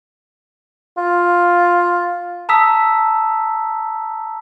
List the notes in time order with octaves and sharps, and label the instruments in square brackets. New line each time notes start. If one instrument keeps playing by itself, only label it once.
[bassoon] F4
[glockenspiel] A5 A#5 D#6 E6 B6